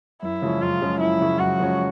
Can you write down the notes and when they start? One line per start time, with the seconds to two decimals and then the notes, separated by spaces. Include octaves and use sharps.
0.23 F#2 E4
0.42 C#3 F3 G#3 C#4
0.62 F#2 F4
0.82 C#3 F3 G#3 C#4
1.00 F#2 E4
1.20 C#3 F3 G#3 C#4
1.39 F#2 F#4
1.60 C#3 F3 G#3 C#4